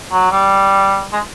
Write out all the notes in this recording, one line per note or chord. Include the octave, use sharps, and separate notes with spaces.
F#3
G3
G#3